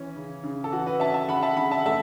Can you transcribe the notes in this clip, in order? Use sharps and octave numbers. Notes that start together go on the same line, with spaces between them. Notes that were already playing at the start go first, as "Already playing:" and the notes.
Already playing: E3 C#4
C#3
C#3
A4
E3 F#4
F#4 B4
C#4 E5 A5
E5 A5
C#3 F#5 B5
E5 A5
C#3 F#5 B5
E5 A5
F#5
A3 E5 A5